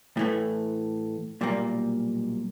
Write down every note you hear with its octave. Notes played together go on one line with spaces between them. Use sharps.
A2 E3 A3
B1 A#2 G3 A#3